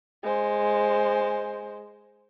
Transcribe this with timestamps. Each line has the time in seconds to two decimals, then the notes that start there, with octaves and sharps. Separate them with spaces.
0.23 G#3 C5